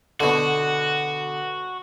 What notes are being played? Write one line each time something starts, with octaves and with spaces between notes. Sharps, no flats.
B2 D3 F#4